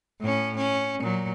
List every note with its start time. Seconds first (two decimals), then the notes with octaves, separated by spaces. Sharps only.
0.21 A2 C#4
0.57 C#4
1.00 A#2 F#3